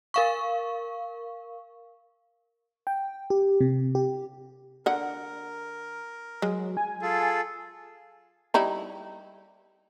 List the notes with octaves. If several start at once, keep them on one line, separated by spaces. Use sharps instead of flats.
A#4 F5 C#6
G5
G4
C3
G4
D3 A#4 F#5
F#3 G#3
G#5
F4 G#4 A4
G3 D#4 E4